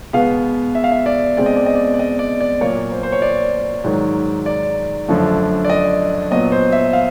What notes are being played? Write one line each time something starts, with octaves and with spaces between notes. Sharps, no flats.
B2 G#3 B3 F5
E5
F5
E5
D5
B2 G#3 C4 D5
D#5
D5
D#5
D5
D5
D#5
D5
D5
A#2 F#3 A#3 C#5
C5
C5
C#5
D5
G#2 D#3 F#3
D5
F#2 D3 F3 A3
D5
D#5
A#2 F#3 B3 D#5
C5
E5
F5